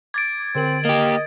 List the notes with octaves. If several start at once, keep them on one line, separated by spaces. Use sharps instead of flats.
D6 G#6 A6 D7
D3 C4 A#4 F#7
A#3 G4 D#5